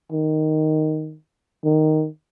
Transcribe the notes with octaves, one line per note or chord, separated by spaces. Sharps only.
D#3
D#3